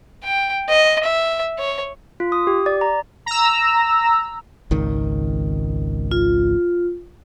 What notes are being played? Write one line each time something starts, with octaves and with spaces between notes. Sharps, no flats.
G5
D#5
E5
C#5
F4
D#6
G4
D5
A#5
A#5 E6
G#1 C#2 D#3
F4